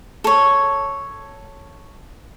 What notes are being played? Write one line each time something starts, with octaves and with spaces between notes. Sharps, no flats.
A4 C#5